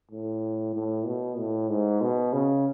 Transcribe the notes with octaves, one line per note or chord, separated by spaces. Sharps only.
A2
A2
B2
A2
G#2
B2
C#3